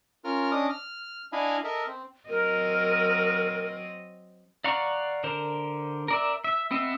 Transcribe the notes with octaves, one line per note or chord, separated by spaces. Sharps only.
C#4 F4 A#4 F6
C#4 D4 D#5 D6 D#6
F6
D4 E4 D#5 F5 G#5 B5
A4 A#4 D#5 E5
C4
F#3 C4 A#4 D#5
D5 F5 F#5 A#5 C#6
D3 A#4 C5
A#4 D5 E5
E5
B3 C4 D#5 E5